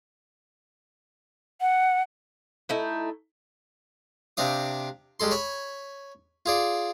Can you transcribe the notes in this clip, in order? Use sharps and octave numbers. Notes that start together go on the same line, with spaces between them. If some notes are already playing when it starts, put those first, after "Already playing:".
F#5
A3 D#4 E4
C3 C4 D4 F5 D#6
G3 G#3 A4 C6
C#5 G#5 B5
F4 G#4 D5